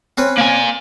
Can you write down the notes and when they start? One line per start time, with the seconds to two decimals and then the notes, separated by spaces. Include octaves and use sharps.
0.18 C4 C#4 B4
0.38 A#3 G#5